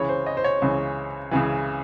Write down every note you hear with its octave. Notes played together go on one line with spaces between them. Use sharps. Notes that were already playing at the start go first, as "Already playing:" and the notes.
Already playing: C#2 C#3 E3 C#5
C5
D#5
C5
C#5
C#2 C#3 E3
C#2 C#3 E3